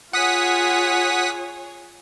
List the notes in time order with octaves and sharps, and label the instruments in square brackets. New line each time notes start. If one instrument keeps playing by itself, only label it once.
[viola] F4 [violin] G#4 C#5 [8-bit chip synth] F#5 D#6 B6